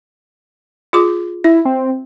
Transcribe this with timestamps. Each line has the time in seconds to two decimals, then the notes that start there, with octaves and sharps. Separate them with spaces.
0.93 F4 G#4 D6
1.44 E4 E5
1.65 C4